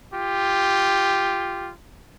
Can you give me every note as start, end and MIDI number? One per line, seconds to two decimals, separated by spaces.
0.14 1.72 65
0.14 1.72 67